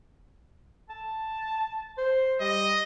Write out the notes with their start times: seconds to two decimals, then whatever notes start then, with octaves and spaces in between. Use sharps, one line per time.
0.90 A5
1.98 C5
2.40 G3 D#5